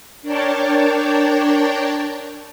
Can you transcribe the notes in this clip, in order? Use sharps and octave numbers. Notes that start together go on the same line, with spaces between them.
D4 A#4 C#5 D5 G5 A5